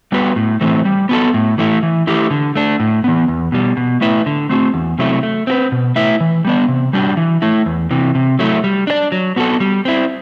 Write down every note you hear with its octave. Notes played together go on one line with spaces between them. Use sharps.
G3 B3 F#4 B4
A2
E3 A3 C4
G3
B3 F#4 A4
A2
E3 A3 E4
E3
A3 E4 G4
D3
A3 D4
A2
E3 B3
E2
B2 G3
B2
A3 E4 B4 E5
D3
A3 C4 F#4
E2
C3 F#3 A3 E4
A3
C4 F#4 B4
B2
A3 E4 B4 E5
E3
G3 B3 D4
C3
G3 D4 F#4
E3
A3 E4
E2
C3 E3
C3
F#3 A3 E4
G3
D4 G4 D5
F#3
B3 F#4 A4
G3
C4 E4